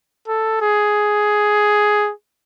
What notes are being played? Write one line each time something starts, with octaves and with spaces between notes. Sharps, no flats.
A4
G#4